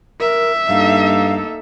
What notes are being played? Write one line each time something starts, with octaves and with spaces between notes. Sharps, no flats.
A#4 E5
G2 A#3 D#4 A4 F5